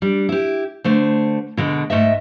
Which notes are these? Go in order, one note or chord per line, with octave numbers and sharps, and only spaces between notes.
G3 D4
E4 G4
D3 A3 C5
B2 D3 G#3
G#2 A3 D#5 E5